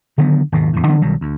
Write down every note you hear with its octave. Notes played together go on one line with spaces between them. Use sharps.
D3 D#3 F#3 B3
G#1 D#2 B2
E2 A2
D3 E3 F#3 B3
B1 D#3 F#3 G3
D2